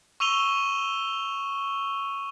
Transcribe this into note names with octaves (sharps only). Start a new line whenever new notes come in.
C#6 E6 D#7 F7 G7